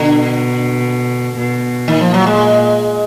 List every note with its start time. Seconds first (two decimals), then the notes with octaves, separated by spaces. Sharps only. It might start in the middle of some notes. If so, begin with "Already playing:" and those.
Already playing: B2 D3
1.38 B2
1.88 A#2 D#3
2.01 F3
2.14 F#3
2.27 G#3